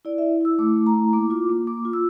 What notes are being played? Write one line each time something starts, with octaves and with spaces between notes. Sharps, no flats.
E4 D5
E4 E5
E4 E6
A3 D6
A3
A#5
E4
A#3 D6
F4 D6
A#3
A#3 D6
F4
E6